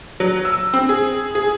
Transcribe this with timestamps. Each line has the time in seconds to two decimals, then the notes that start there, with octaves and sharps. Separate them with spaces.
0.20 F#3
0.45 E6
0.74 C4
0.89 G#4
1.35 G#4